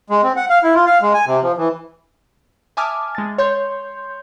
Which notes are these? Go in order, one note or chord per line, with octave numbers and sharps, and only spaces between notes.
G#3
C4
F#5
F5
E4
F4
F5
G#3
G#5
C3
F3
E3
E5 G#5 A5 D6 D#6 F6
G#3 A6
C#5 C6 G6